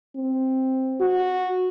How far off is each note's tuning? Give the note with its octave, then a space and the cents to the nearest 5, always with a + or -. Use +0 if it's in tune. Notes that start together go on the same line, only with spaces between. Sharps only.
C4 +5
F#4 -10